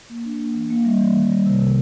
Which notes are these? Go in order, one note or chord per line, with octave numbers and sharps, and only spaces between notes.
A#3
D4
A#3
E3
A#3
G3
E3
D#3
G3
C3
C3